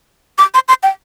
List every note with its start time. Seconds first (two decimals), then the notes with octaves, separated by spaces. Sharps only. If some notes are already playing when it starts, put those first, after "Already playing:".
0.38 D6
0.54 C6
0.68 C6
0.83 G5